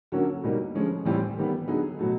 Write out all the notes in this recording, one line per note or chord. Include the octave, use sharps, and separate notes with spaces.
D3 F#3 A#3 C#4 F#4
B2 G3 A#3 D#4
D3 F3 G#3 C#4
A2 E3 G3 C4 F4
D#3 G3 B3
D3 F#3 B3 D#4 G#4
B2 F#3 A3